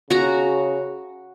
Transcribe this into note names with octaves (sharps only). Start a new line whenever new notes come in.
C#3 F#4 A#5